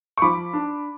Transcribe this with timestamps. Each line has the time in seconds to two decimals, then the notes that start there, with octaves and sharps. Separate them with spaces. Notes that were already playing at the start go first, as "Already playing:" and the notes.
0.18 C#6
0.22 F3 B5 D6
0.53 D4